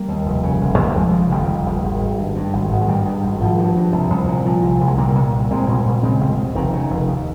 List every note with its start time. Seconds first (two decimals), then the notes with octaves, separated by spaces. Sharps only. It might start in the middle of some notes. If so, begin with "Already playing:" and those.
Already playing: G3 A#3
0.08 D#2
0.26 F1
0.43 C#3
0.61 F1
0.78 D#2 G#3
0.87 G3
0.95 F1 F3 G#3
1.13 C#3
1.31 F1 D#3 G3
1.48 D#2
1.66 F1
1.83 G#1
2.01 G#1
2.18 G2
2.36 G2
2.53 G#1
2.71 G#1
2.81 G#3
2.88 G2 D#3 G3
3.05 G2
3.23 G#1
3.40 G#1 F3
3.58 G2
3.76 G2
3.92 C2
4.10 C2
4.28 A#2
4.46 A#2 F3
4.63 C2
4.81 C2
4.88 G#3
4.98 A#2 G3 A#3
5.15 A#2
5.33 C2
5.50 C2 G#3 C4
5.68 A#2
5.86 A#2
6.03 C#3 G#3 C4
6.20 F1
6.38 D#2
6.55 F1 D#3
6.73 C#3
6.90 F1
7.08 D#2